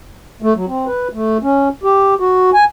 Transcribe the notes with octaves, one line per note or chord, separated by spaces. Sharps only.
A3
F#3
C4
B4
A3
C#4
G4
F#4
G#5